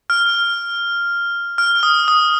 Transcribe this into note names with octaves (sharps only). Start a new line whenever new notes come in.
F6
F6
D#6
D#6